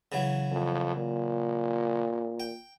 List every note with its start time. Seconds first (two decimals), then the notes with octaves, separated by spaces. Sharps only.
0.12 C#3 E3 F#3
0.51 F2
0.96 A#2
2.40 G5